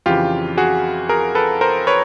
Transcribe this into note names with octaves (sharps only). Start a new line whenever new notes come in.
F2 C#3 E3 F4 G4
F#4 G#4
G#4 A#4
A4 B4
A#4 C5
B4 C#5